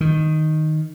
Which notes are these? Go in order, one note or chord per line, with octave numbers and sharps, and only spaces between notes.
D#3